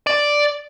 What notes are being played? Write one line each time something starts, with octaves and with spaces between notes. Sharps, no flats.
D5